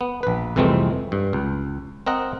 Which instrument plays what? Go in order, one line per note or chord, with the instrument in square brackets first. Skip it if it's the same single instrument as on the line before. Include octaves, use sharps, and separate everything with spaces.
[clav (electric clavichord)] B3
A#1 B4
C2 F2 E3 G#3 A3 C4
G2
C#2
C4 A#4 D#5 F#5